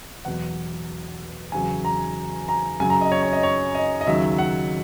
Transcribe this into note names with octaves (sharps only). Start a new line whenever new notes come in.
E2 B2 F#3 F#5
E2 C#3 F#3 G#5
A#5
A#5
F#2 C#3 F#3 G#5
A#5
D#5
C#5
C#5
D#5
C#5
D#5
D#5
D#2 C#3 F#3 E5
F#5